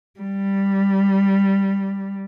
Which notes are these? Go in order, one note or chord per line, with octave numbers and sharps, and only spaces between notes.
G3